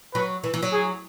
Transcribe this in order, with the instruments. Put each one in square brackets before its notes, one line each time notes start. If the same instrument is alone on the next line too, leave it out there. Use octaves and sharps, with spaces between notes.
[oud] F#3 [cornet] B4
[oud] E3
E3
F#3
[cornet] G#4